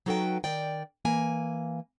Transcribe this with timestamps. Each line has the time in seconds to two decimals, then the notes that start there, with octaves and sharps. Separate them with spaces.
0.06 F#3 D#4 F#4 A4 B4 G5
0.44 D#3 D5 G5
1.05 E3 A#3 G#5